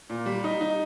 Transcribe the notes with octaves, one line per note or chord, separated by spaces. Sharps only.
A#2
G3
D#4
D#4